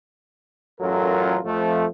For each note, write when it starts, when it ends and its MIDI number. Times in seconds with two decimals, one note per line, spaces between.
0.80 1.38 33
0.80 1.38 42
0.80 1.38 54
0.80 1.38 65
0.80 1.38 69
0.80 1.38 70
1.44 1.86 41
1.44 1.86 53
1.44 1.86 57